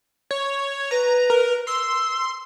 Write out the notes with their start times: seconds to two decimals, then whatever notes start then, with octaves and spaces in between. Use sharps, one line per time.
0.31 C#5
0.91 B4 A#5
1.30 A#4
1.67 C6 E6